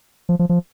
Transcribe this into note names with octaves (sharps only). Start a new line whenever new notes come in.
F3
F3
F3